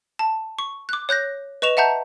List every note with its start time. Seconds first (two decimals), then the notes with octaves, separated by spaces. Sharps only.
0.19 A5
0.59 C#6
0.89 D6 F#6
1.09 C#5 F#6 G6 A#6
1.62 B4 D#5 C#6 E7 F7
1.77 E5 F#5 A5 A#5 G6